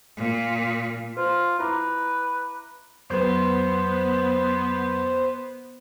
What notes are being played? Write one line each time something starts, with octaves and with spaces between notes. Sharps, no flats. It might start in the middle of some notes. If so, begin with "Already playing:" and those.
A#2
F4 C5
E4 B4 A#5 D6
F2 F#3 B3 B4 C5